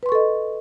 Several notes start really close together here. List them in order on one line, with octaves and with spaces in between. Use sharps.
B4 C6 C#6 A4 D#5